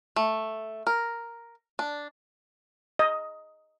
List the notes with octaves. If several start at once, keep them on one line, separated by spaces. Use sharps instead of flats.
A3
A#4
D4
D#5